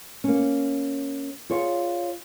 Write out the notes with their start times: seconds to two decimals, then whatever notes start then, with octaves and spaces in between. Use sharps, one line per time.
0.24 A#3 C#4
1.50 F4 G#4 C#5 D5 F5